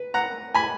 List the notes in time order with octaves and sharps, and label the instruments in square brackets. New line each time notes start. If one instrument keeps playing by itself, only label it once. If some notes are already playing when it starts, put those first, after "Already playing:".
Already playing: [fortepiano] B4
F#5 A#5
G#5 B5